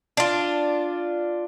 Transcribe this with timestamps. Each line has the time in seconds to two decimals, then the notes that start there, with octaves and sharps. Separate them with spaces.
0.17 D4 F4